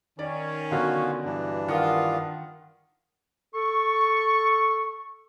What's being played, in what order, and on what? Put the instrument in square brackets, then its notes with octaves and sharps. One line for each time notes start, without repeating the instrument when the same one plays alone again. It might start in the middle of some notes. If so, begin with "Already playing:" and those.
[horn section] D#3 C#4 [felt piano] D5
[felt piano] B2 D3 F#3 [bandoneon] F4 F#4 F5
[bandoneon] G2 E3 D4
[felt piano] D#3 [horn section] F4 [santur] F#5 D#6
[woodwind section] A4 C#6